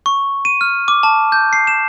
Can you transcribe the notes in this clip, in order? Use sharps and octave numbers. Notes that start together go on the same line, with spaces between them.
C#6
D#7
F6
D6
A5
G6
C7
E7